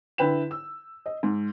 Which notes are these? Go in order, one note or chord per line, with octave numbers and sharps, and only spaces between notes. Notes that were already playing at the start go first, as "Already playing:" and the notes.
D3 E4 B4 G5 E7
E6
D#5
G#2